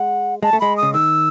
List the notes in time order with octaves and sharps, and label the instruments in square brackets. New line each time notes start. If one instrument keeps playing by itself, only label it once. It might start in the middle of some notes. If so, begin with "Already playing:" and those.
Already playing: [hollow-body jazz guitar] G#3 [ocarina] F#5
[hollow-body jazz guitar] G#3 [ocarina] A5
[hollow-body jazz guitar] A3
[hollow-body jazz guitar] G#3 [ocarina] B5
[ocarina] D#6
[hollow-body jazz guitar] C#3
[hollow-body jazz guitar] D#3 [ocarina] E6